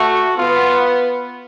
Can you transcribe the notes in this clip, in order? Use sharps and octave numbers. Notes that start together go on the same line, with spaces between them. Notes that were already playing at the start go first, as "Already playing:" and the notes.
Already playing: A3 F#4
B3 F4